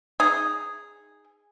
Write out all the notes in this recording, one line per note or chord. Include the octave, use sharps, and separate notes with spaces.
D#4 G#4